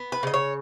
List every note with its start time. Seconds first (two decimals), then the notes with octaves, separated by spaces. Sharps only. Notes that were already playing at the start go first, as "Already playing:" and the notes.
Already playing: B3
0.12 B4
0.23 C#3 D#5
0.34 C#5